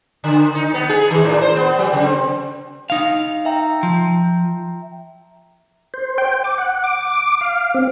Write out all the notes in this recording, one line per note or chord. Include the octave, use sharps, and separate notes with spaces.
D3
D#4
B3
G#4
D#3
A2
C5
B3
F#3
C#3
C4
D#4 F5
E5 G5 A#5
F3
C5
G5
D6
F#5
D6
F5
C4